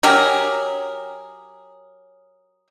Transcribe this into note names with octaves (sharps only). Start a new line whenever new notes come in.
F#3 G4 G#4 A#4